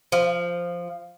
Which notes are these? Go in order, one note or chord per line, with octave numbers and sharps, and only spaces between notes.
F3